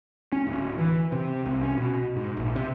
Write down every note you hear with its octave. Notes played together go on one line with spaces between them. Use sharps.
C#4
D1
E3
C3
C2
C#4
B2
G#2
A#1
C3